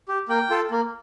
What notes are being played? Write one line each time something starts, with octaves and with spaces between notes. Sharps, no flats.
G4
A#3 G5
F4 A4
A#3